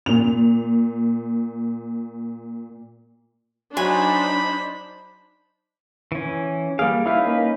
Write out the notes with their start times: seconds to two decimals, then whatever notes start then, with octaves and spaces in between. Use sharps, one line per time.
0.06 A#2 F7
3.77 F#3 D4 D#4 C5 G#5 B5
6.12 E3 C#4
6.79 G3 A#3 G#4 F5
7.06 C#4 D#4 E4 B4 F5
7.27 A#3